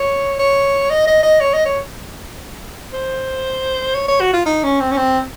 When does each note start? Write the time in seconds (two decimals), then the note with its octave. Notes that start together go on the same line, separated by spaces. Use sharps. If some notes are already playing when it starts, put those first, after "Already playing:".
Already playing: C#5
0.39 C#5
0.90 D#5
1.07 D#5
1.23 D#5
1.41 C#5
1.54 D#5
1.66 C#5
2.93 C5
3.95 C#5
4.08 C#5
4.21 F#4
4.33 F4
4.46 D#4
4.64 C#4
4.80 C4
4.91 C#4
4.97 C4